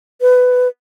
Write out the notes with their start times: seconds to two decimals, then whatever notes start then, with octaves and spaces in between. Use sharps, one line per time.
0.21 B4